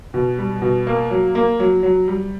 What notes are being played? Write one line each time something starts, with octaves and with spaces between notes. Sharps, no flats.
B2
G3
B2
A#3
F#3
A#3
F#3
F#3
G3